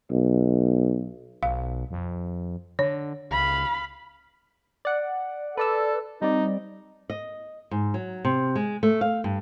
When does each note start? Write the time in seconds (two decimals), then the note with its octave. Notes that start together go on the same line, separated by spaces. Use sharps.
0.11 B1
1.43 B1 F5
1.91 F2
2.79 D3 C#5
3.31 C#2 F5 B5
4.85 D5 F#5
5.57 A4 B4 D5 E6
6.22 G3 C4 D#4 D5
7.10 D#5
7.71 G#2
7.94 F#3
8.25 C3
8.55 G#3
8.83 A3
9.01 F5
9.24 G2